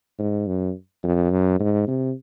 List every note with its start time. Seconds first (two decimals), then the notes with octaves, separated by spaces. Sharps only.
0.19 G#2
0.47 F#2
1.03 F2
1.31 F#2
1.60 G#2
1.87 C3